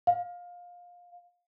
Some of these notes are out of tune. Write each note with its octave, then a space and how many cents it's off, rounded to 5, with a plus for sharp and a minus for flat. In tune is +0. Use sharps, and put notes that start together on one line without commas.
F5 +20